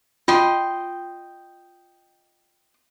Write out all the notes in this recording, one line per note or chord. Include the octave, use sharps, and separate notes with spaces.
F4 D#5 G5 C6